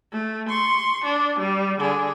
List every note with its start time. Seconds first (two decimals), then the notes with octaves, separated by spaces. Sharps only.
0.12 A3
0.48 C6 C#6
1.04 D4
1.38 G3
1.79 D3 G#4